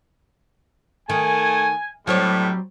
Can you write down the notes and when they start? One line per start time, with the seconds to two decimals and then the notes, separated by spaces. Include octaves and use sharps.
1.09 D#3 A3 G#5
2.07 A2 F#3 G3 C4 C#5